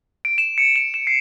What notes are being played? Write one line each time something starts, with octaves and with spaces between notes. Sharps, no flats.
D7
E7
C#7
E7
E7
C7